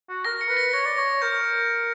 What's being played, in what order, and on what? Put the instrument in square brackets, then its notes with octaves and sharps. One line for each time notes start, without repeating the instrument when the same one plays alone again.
[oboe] F#4
[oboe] A#4 [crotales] A#6
[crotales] C#7
[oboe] B4
[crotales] A#6
[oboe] C#5 [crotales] A#6
[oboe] D5
C#5
[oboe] A#4 [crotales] G6